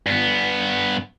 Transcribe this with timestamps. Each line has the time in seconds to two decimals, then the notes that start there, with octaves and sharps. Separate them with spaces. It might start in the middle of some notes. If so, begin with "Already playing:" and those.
0.06 G2 B3